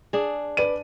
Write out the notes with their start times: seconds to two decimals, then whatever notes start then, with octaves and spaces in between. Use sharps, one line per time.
0.13 D4 G#4
0.57 B4 D5 D#7